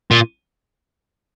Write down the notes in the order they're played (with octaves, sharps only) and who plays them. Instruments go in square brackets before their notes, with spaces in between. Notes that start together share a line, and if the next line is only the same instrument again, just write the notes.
[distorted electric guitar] A#2